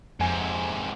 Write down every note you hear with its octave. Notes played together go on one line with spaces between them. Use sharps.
F2 G#2 C3 G#5